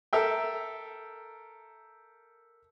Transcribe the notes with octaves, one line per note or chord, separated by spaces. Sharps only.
A4 A#4 E5 G5